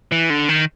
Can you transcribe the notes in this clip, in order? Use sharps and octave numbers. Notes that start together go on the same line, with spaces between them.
E3
D3
D#3